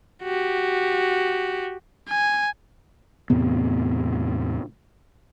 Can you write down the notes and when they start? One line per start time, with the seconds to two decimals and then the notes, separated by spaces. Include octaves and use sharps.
0.23 F#4 G4
2.08 G#5
3.30 E2 A2 C3 B3